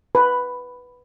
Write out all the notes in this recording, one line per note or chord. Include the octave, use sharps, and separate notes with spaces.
B4